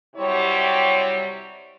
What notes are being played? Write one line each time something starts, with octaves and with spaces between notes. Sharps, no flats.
C3 F#3 G3 E4 C#5